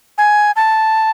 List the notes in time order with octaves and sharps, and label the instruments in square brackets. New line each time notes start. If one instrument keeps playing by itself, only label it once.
[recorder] G#5
A5